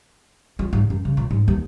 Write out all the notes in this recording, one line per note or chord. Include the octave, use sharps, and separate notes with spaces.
F4
G#2
F#2
C#3
A#2
G#2
D#2